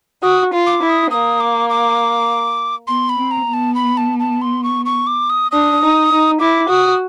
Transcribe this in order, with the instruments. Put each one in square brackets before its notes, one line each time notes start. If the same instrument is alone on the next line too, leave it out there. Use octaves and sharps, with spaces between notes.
[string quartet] F#4 [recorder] D#6
[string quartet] F4
[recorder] D6
[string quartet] E4
[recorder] D#6
[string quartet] A#3 [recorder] D#6
[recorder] D6
D6
[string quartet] B3 [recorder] C6
[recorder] B5
[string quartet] C4
[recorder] A#5
[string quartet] B3
[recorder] A5
B5
A5
A5
C6
C#6
C#6
D6
D#6
[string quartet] D4 [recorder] D#6
[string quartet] D#4
D#4
[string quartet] E4 [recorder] D6
[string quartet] F#4 [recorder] D#6